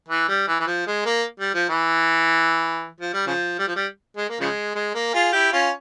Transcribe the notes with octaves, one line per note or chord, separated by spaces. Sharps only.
E3
G3
E3
E3
F3
G#3
A#3
G3
F3
E3
F3
G3
C#3 F3
G3
F3
G3
G#3
A#3
C#3 F3 G#3
G#3
A#3
F4 G#4
E4 G4
C#4 F4